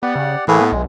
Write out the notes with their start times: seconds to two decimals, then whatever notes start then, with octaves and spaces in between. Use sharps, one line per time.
0.03 B3 G4 D5 F#5
0.16 C#3
0.48 A2 E3 A#3 G#4 B4
0.61 B3
0.72 B1 G#3